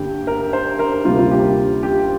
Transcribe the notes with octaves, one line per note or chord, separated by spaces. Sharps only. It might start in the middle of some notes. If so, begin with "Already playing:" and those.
Already playing: G2 D3 A#3 D4 G4
A#4
C5
A#4
D2 C3 G3 A#3 D4 F4
F4
G4
G4